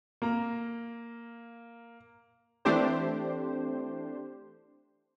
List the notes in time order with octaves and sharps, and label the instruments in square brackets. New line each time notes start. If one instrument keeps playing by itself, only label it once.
[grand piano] A#3 A#5
[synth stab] E3 A3 C4 D4 G4 C5